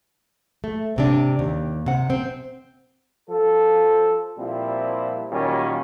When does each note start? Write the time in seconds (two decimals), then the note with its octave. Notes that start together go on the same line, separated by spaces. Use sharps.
0.64 A3
0.96 G#2 C3 D4
1.39 D#2
1.86 C3 F#5
2.10 C4
3.30 F3 A4
4.38 A#2 F3 G3 C4 E4
5.32 A#2 D#3 F#3 G3 C#4